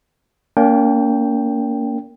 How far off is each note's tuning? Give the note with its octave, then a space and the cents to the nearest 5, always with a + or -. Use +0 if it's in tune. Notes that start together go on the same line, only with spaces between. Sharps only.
A#3 -5 C#4 +45 G5 +0